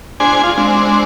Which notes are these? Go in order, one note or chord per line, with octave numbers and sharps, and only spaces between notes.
D4 G#4 C5 G#5
F4 G#4
G#3 C4 D4